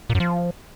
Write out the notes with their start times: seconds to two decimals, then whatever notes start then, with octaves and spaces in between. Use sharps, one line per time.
0.10 A#2
0.15 F#2
0.20 F3